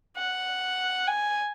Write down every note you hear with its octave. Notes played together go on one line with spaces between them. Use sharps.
F#5
G#5